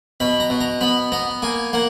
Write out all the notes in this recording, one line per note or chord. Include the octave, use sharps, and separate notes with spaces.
B2 B5
A#5
B2
A#5
B3 B5
B3 A#5
A#3 G#5
A#3 F#5